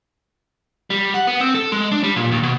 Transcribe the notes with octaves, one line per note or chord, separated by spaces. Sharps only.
G3
F#5
B3
C4
A4
G#3
D4
G3
A#2
D#2
B2